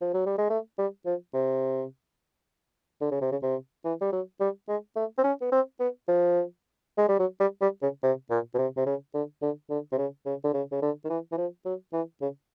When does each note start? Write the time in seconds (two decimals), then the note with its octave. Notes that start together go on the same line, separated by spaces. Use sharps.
0.01 F3
0.14 F#3
0.26 G3
0.38 G#3
0.50 A3
0.78 G3
1.06 F3
1.34 C3
3.01 D3
3.11 C#3
3.21 C3
3.32 C#3
3.42 C3
3.85 E3
4.01 G3
4.12 F#3
4.40 G3
4.68 G#3
4.96 A3
5.18 C4
5.24 C#4
5.41 B3
5.52 C4
5.80 B3
6.08 F3
6.98 G#3
7.08 G3
7.19 F#3
7.40 G3
7.61 G3
7.82 C#3
8.03 C3
8.30 A#2
8.54 B2
8.58 C3
8.77 C3
8.86 C#3
9.14 D3
9.42 D3
9.70 D3
9.92 C3
9.98 C#3
10.26 C#3
10.44 D3
10.54 C#3
10.72 C#3
10.82 D3
11.05 D#3
11.10 E3
11.32 E3
11.37 F3
11.65 F#3
11.93 E3
12.22 C#3